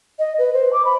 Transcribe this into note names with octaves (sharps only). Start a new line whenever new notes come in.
D#5
B4
C5
D6
B5